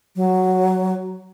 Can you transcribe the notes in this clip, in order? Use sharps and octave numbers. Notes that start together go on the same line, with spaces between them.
F#3